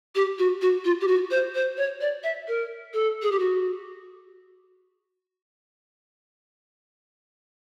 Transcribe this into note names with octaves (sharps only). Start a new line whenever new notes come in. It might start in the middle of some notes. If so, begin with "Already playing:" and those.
G4
F#4
F#4
F4
G4
F#4
C5
C5
C#5
D5
E5
A#4
A4
G#4
G4
F#4